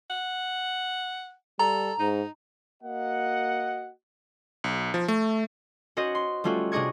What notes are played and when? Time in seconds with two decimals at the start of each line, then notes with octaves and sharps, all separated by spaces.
0.10 F#5
1.59 G3 A4 A#5
1.99 G#2 D#4
2.83 A#3 F#4 D#5 F#5
4.64 B1
4.94 F3
5.08 A3
5.97 C#4 F#4 C5 D#5 F#5
6.15 C6
6.44 G3 A3 C#4 F4 F#4
6.72 C3 D4 G#4 D#5 C#6 G#6